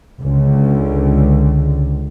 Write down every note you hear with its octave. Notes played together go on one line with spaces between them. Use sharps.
C#2 D3